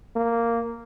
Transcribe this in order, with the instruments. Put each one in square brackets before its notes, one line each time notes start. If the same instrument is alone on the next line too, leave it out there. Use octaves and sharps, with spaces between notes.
[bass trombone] A#3